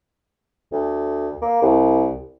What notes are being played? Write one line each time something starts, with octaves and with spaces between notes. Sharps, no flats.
D2
A#3
C2